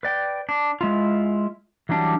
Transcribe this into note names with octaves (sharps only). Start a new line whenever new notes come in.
B4 D5 G5
D4
G#3 E4 F4
E3 F#3 G3 D4